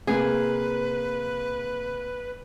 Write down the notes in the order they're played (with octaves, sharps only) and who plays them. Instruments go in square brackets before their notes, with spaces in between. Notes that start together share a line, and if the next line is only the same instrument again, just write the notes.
[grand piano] C3 A#3 [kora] G#4 [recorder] B4